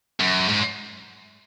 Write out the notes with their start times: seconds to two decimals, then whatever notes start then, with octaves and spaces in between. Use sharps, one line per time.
0.20 F#2
0.49 G#2